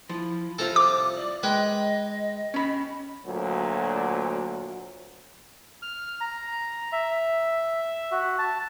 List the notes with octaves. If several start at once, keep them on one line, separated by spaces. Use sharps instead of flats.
F3 E4
C2 F4 A4 C5 A#5
D6
D5
G#3 B4 D#5 G5
C#4 B5
D2 A#2 F#3
F6
A#5
E5
F#4
A5